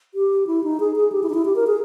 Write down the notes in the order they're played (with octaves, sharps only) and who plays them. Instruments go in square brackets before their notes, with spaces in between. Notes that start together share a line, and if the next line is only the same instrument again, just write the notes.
[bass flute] G4
E4
D#4
G#4
G#4
G4
E4
D#4
E4
G4
A#4
G#4